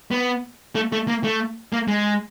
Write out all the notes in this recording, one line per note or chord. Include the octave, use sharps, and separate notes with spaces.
B3
A3
A3
A#3
A3
A#3
G#3